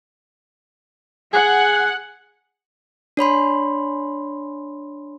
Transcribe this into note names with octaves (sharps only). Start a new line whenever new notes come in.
G#4 F#5
D4 C#5 B5 C6